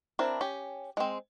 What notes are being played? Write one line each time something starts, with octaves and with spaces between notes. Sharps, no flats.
C4 D4 E4 A#4
C#4 G4
G#3 C4